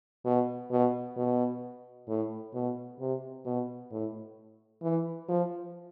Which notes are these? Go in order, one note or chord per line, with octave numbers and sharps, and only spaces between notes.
B2
B2
B2
A2
B2
C3
B2
A2
E3
F3